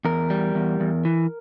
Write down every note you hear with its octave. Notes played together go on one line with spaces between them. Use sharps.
E2 A#4
G3
E2
E2
E3